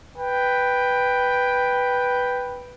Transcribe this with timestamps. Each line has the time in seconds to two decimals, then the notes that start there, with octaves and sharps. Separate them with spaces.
0.18 B4 G5